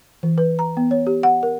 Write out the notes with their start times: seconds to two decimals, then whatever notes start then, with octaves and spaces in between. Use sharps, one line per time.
0.23 E3
0.38 B4
0.59 A#5
0.77 B3
0.91 C#5
1.07 G4
1.23 F#5
1.43 A#4